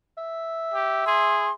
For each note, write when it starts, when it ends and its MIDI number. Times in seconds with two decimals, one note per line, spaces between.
0.18 1.52 76
0.74 1.06 67
1.06 1.52 68
1.06 1.52 84